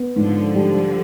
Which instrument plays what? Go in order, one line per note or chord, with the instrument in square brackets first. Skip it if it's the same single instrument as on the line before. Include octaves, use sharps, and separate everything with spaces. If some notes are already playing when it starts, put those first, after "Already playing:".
Already playing: [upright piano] B3
[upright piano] G#2 [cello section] D3 F3
[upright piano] G3